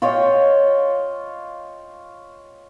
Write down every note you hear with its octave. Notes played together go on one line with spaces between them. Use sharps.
F4 C#5 D#5 G5